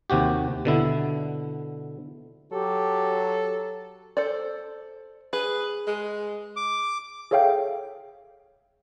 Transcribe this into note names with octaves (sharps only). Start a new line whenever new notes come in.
D#2 C3 F#4 G4
B2 D3 E4
F#3 G4 A4
A4 C5 D5
G#4 B4
G#3
D6
G#4 A4 C#5 E5 F5 G5